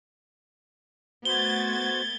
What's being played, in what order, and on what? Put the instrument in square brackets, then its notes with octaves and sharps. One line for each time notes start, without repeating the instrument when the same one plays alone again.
[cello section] A3 B3 [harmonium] F#4 C5 [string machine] G#6 A6 [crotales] G7